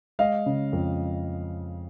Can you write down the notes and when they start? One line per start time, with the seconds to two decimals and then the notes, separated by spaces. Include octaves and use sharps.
0.19 G#3 D#5 F5
0.46 C#3
0.73 F2